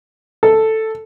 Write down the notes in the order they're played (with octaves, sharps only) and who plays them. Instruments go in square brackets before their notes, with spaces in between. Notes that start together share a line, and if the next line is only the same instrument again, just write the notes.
[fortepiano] A4